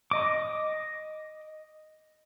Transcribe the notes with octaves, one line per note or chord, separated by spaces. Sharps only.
D#5 D6